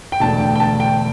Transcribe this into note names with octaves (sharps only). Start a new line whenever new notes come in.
G5
E1 D2 D3 A5
G5
G5
A5
G5